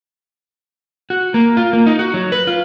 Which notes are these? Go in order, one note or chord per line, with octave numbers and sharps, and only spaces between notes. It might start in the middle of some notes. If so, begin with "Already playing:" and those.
F#4
A#3
F4
A#3
D#4
F#4
F#3
B4
F4